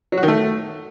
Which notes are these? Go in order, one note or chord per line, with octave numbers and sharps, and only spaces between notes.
F#3
F#4
D#3
A3